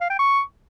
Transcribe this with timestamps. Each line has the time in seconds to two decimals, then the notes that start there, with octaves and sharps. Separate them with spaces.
0.01 F5
0.10 G5
0.19 C#6